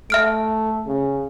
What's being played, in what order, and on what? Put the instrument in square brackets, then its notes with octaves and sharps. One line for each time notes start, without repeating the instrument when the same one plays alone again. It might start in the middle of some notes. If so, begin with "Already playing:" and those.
[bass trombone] A3 [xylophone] E5 F6 D7
[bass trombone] C#3